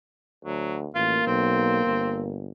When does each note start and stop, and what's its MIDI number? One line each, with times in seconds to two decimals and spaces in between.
0.45 0.89 38
0.45 0.76 54
0.95 1.20 33
0.95 2.48 58
0.95 1.26 65
1.27 1.84 35
1.27 2.26 60
1.85 2.49 31